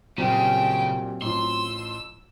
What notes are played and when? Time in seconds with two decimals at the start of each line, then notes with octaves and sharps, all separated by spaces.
0.18 A#2 C#3 F#3 G3 C4 G5
1.22 A1 F3 C6 E6